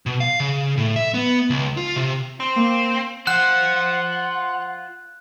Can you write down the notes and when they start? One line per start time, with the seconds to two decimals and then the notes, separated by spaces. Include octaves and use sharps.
0.06 B2
0.20 F5
0.40 C#3
0.77 A2
0.96 E5
1.14 B3
1.50 C#2
1.77 F4
1.96 C3
2.40 C4
2.56 A#3
3.27 F4 C5 F#5 F#6